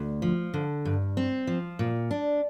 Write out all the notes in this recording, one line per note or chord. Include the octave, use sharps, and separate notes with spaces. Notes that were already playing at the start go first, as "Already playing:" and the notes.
Already playing: D2
F3
D3
G2
C4
F3
A#2
D4